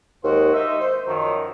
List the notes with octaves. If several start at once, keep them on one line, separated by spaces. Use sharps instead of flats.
D#2 G#3 F#4 C5
D#4 E5
C5
F#2 D#3 F3 F#3